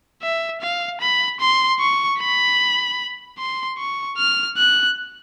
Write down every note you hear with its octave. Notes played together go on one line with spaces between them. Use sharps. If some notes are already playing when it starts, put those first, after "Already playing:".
E5
F5
B5
C6
C#6
B5
C6
C#6
F6
F#6